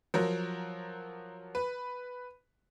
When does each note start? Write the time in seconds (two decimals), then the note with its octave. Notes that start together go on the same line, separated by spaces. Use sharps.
0.14 F3 F#3 A#4
1.55 B4